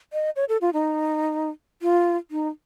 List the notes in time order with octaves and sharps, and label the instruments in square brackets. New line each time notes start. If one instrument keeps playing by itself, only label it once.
[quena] D#5
C#5
A4
F4
D#4
F4
D#4